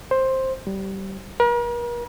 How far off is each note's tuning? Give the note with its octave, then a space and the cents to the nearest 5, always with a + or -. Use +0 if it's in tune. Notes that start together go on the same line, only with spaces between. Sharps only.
C5 +10
G3 -20
A#4 +45